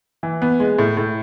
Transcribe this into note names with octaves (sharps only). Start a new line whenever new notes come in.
E3
B3
G#3
A2
A2